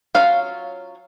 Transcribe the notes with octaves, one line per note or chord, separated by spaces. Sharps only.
F#3 C#4 F4 F5